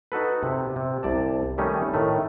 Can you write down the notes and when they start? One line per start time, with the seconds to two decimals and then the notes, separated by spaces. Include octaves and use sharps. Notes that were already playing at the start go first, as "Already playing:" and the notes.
0.12 D#4 F#4 A4 B4
0.43 C3
0.76 C3
1.03 C2 D5 A5
1.58 D#3 G3 A3 C#4 D#4
1.94 A2 D#3 A3